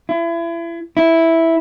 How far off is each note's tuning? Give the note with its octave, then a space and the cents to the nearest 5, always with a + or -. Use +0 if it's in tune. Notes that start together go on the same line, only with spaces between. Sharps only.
E4 +35
E4 -5